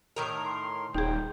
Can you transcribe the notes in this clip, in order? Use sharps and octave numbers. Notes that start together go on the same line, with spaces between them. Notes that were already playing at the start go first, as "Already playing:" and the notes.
A2 D#3 A#4
C6
D#1 D#4 G#4 G5